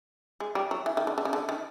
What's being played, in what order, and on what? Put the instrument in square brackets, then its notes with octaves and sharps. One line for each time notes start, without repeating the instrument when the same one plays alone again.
[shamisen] G#3
G3
F#3
E3
D#3
D3
D3
C#3
D3
D#3